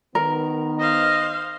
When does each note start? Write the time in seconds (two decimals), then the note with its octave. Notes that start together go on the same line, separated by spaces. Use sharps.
0.15 D#3 B3 A#4
0.79 C5 D#5 F5